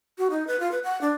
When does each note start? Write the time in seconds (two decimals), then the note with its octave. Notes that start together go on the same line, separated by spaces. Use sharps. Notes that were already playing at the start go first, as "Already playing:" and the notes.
0.18 F#4
0.30 D#4
0.47 B4
0.60 F4
0.72 B4
0.84 F#5
1.01 D4